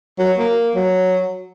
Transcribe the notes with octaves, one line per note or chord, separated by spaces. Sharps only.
F#3
A#3
F#3